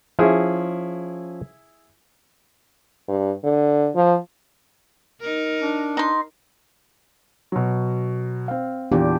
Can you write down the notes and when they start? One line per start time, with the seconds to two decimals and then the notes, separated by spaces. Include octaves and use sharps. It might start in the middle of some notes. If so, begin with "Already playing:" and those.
0.19 F3 C#4 E4 G#4
3.08 G2
3.44 D3
3.96 F3
5.21 D#4 A#4
5.62 D4
5.97 D#4 C6
7.52 B2 F#3
8.48 C4 F5
8.92 E2 A#2 B3 D4 G4